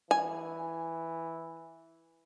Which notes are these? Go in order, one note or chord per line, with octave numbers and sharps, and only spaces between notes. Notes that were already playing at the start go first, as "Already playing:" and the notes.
E3 G#5